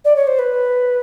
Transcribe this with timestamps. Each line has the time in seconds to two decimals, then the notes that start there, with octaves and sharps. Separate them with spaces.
0.05 D5
0.16 C#5
0.27 C5
0.39 B4